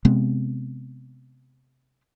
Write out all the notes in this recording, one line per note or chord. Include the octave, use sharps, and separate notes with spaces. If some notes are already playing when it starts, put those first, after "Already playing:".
C3 G#3 B3 C4